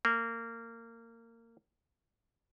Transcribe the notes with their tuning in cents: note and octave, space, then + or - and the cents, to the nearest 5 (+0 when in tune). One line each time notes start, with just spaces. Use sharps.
A#3 -25